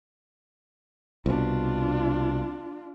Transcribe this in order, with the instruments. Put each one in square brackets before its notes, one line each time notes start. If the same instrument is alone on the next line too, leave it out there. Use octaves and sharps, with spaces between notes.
[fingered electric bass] C2 B2 [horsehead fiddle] D4 F4